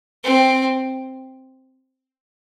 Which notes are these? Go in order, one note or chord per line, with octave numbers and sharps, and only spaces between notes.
C4